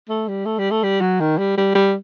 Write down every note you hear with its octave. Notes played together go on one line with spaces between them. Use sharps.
A3
G3
A3
G3
A3
G3
F#3
D#3
G3
G3
G3